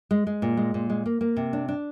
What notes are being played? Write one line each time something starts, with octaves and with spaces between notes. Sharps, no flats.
G#3
G#3
A#2
G#3
A#2
G#3
A#3
A#3
C3
D4
D4